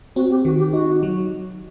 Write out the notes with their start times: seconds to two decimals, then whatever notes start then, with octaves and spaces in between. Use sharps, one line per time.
0.16 C4 F#4
0.31 G4
0.45 D#3 F#4
0.59 G4
0.73 D#4 F#4
1.03 F#3